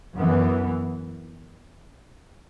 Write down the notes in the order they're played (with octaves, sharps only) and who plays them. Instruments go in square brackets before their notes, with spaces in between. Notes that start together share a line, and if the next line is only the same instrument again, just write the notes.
[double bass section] F#2 E3 B3